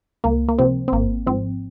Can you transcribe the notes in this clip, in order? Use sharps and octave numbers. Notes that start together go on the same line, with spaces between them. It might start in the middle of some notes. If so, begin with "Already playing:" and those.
C#2 A#3
A#3
C3 F3 C4
C4
G#1 A#3
G#2 F3 C4